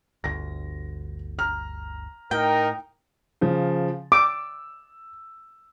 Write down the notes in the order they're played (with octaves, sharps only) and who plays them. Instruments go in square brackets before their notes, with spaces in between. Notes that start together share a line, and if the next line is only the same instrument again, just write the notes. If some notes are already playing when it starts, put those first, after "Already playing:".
[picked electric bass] G1 D2 [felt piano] A#6
[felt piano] A#5 F6
[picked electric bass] A2 [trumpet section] D#4 A#4 [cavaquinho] G5
[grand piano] C#3 F3
[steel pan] D6 [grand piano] E6